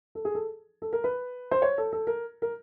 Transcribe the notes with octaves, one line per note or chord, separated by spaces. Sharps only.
A4
G#4
A4
A4
A#4
B4
C5
C#5
A4
A4
A#4
A#4